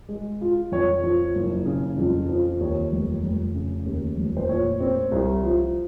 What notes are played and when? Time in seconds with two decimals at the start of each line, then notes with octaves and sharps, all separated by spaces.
0.09 G#3
0.41 F4
0.72 F2 C#5
1.04 F3
1.35 F#1
1.66 C#3
1.98 F2
2.29 F3
2.60 D#2 C#5
2.92 F1
3.24 F1
3.54 C#3
3.86 D#2
4.18 F1
4.37 C5
4.49 A#2 C#5
4.80 C4
5.11 C2
5.43 F3